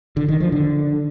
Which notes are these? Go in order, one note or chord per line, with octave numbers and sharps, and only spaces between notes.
D3
D#3
F3
D3